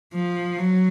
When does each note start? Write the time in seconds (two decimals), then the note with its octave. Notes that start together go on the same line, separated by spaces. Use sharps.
0.14 F3
0.58 F#3